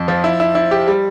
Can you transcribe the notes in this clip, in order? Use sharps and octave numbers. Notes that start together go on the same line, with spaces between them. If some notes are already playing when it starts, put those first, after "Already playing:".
Already playing: F2
F3
E4
E4
E4
G4
G3